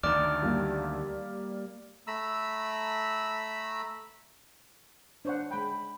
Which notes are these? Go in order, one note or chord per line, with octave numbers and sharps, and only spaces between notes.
D2 D#3 D5 D6 F6
G3 A#3 G4
A3 A#5 B5 E6
D4 C5 C#5 F#5
G#3 G5 B5